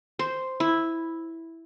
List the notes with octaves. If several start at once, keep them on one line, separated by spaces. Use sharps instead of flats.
C5
E4